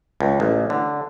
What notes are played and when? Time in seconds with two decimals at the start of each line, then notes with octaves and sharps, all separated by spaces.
0.20 C#2
0.40 A1
0.70 D3